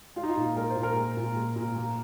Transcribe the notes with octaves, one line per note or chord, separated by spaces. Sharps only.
G#3 F4
D#4
F4
A#2
G#3 A#4
C5
A#2
A#4
G#3
A#2
G#3
A#2
A#3